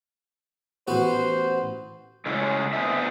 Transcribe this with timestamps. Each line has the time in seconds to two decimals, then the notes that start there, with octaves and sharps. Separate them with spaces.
0.88 A1 B3 F#4 C5
2.26 C#3 G#3 A3 C#4 E4
2.73 B3 C4 D4 G#4 E5